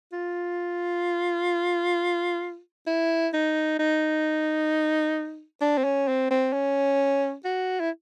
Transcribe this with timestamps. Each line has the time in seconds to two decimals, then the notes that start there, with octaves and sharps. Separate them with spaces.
0.13 F4
2.87 E4
3.34 D#4
3.79 D#4
5.61 D4
5.77 C4
5.84 C#4
6.08 C4
6.31 C4
6.53 C#4
7.45 F#4
7.80 E4